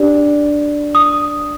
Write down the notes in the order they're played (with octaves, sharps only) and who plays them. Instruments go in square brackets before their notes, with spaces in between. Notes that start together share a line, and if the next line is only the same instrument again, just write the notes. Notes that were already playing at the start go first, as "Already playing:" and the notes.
Already playing: [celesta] D4 G4 D5
D#6